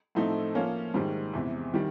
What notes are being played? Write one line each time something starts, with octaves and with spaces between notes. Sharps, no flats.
A2 F3 A3 C4 D#4
F3 A#3 C#4
G#2 D#3 G3
E2 C3 E3
D#3 G3